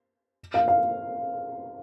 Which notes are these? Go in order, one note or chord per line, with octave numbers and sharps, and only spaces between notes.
F5
F5